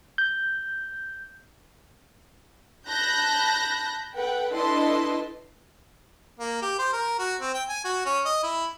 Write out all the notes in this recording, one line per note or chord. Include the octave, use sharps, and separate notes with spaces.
G6
A5 B5 F#6 G6 A#6
A4 B4 F#5 G5
D4 E4 A4 B4 D#5 C6
A#3
G4
C5
A#4
F#4
C4
G5
G#5
F#4
C#4
D#5
E4